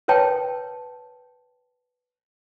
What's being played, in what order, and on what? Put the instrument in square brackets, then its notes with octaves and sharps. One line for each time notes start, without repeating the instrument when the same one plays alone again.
[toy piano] A#4 B4 C#5 G5 A5